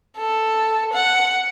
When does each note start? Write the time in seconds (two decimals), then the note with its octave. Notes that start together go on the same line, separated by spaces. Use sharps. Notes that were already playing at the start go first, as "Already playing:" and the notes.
0.18 A4
0.93 F#5